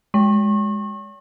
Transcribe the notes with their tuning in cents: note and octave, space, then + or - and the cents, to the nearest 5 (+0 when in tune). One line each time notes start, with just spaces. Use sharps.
G#3 +0 C#6 -35